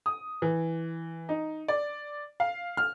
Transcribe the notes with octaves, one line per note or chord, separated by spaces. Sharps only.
D#6
E3
D#4
D5
F5
F6